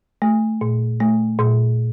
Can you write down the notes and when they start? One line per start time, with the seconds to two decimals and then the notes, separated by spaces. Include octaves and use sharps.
0.22 A3
0.61 A#2
1.00 A3
1.39 A#2